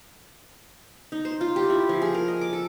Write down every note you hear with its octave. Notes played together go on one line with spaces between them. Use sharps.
D#4
C5
F4
G4
E4
F3
G#4
A#4
D#5
D6
A4